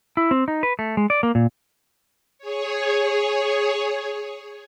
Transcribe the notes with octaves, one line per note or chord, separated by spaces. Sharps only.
E4
C4
D#4
B4
A3
G#3
D5
A#3
A#2
G#4 C#5